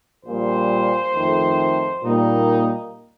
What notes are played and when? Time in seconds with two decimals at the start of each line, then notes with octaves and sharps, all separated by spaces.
0.24 A#1 A#2 G3 C5
1.13 F2 D#3 A3
2.02 A#2 G3 A#3 D#4